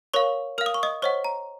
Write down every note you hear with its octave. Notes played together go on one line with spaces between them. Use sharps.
A#4 C#5 F5 C#6
A#4 F5 F6
D#6
C#6
D#5 D#6
C5 C#5 D#5 F#5 C#6
A#5